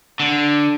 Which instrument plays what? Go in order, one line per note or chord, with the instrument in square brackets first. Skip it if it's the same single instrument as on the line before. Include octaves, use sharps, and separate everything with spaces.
[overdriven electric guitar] D3